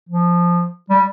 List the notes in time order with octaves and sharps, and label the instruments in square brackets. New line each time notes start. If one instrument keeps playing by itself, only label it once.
[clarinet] F3
G3